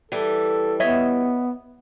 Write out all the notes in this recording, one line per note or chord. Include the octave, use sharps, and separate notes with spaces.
E3 G3 A4
B3 C#5 D#5 E5